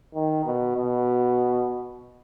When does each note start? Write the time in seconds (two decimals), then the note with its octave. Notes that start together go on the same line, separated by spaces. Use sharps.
0.15 D#3
0.45 B2
0.76 B2